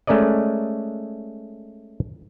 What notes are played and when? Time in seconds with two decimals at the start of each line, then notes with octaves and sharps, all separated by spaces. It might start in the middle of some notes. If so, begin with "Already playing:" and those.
0.07 G#3 A3 C#4 A#4 D5 D#5